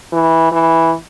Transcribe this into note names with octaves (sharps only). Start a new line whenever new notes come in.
E3
E3